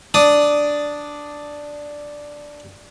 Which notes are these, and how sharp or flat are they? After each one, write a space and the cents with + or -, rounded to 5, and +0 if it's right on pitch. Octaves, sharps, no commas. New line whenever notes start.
D4 +0 D#6 +0